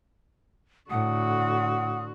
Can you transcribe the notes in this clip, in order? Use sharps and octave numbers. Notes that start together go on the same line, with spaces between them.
A2 D3 F#4 F#5 D#6